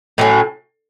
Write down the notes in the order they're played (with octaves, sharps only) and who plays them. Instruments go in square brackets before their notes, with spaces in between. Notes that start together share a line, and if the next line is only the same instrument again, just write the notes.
[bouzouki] A2 F#3 C#4